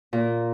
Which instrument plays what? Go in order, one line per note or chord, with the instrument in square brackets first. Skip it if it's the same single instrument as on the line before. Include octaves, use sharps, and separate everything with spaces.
[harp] A#2